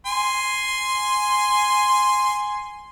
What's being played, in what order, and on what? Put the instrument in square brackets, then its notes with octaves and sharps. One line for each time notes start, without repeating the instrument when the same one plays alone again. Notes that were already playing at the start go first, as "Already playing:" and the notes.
[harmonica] G#5 C6